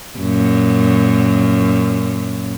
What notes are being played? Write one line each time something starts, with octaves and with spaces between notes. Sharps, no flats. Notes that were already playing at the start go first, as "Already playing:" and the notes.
F#2 A#2